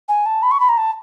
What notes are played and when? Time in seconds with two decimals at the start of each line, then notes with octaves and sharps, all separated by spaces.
0.09 G#5
0.26 A5
0.43 B5
0.51 C#6
0.60 B5
0.69 A#5
0.77 A5